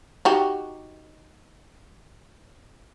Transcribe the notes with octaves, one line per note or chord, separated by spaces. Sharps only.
D#4 F#4 G4